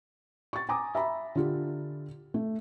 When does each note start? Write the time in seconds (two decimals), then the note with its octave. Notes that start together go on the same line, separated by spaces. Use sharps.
0.53 C#6 A6
0.69 G#5 A#5 D6 D#6
0.95 E5 A#5 B5
1.35 D3 F4 G4
2.34 A3